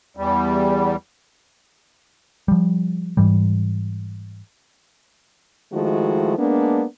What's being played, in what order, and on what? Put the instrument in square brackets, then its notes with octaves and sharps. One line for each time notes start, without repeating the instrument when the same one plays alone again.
[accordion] E2 G3
[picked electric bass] F3 G3
G#2 E3 G3
[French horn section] D#3 F3 G#3 A3 E4 F#4
G#3 A#3 B3 D4